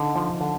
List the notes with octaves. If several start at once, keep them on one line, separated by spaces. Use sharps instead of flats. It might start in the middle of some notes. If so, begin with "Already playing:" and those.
Already playing: D3 D#4
F3
D3